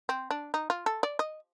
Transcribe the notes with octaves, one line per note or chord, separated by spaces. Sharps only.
C4
D4
D#4
F4
A4
D5
D#5